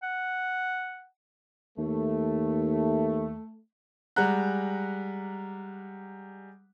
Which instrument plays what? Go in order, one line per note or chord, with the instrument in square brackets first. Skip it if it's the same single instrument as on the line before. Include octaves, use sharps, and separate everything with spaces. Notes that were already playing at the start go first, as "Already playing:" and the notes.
[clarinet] F#5
[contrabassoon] D#2 [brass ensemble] A3
[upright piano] G3 G#3 F#5 A#5 F#6